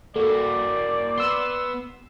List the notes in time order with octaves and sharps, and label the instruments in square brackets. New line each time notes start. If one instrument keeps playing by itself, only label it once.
[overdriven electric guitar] A#3 F#4 [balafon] A4 [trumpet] D5
[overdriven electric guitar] B3 [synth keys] C6 E6 E7